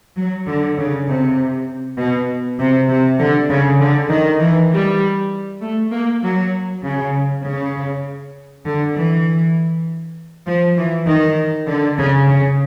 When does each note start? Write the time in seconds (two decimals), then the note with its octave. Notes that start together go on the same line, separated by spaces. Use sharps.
0.16 F#3
0.46 D3
0.77 C#3
1.07 C3
1.98 B2
2.59 C3
2.89 C3
3.19 D3
3.49 C#3
3.80 D3
4.10 D#3
4.40 E3
4.71 G3
5.62 A3
5.92 A#3
6.22 F#3
6.83 C#3
7.43 C#3
8.65 D3
8.95 E3
10.47 F3
10.77 E3
11.07 D#3
11.68 D3
11.98 C#3
12.28 C#3